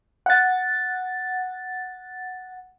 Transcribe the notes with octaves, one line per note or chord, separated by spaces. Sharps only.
F#5 A6